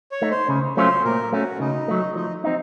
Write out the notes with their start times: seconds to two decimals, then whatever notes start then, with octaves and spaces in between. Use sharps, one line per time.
0.12 C#5
0.22 A3 D#4
0.31 C5
0.48 C#3
0.77 F#3 A3 C#4 F4 C5
1.04 A#2 A#4
1.32 A3 C#4 F#4
1.60 C#3 D#4
1.88 F#3 A3
2.16 F3 D#4
2.44 C4 D#4